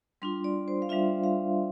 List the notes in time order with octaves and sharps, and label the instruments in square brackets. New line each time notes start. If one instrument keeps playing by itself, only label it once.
[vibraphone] G3 D4 F4 C6
D5
C5
F5
G3 D4 F4 E5
F5